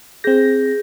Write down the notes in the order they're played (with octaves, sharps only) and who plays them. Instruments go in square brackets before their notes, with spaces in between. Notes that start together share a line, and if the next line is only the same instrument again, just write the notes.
[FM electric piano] C4 A#6 [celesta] G#4 G6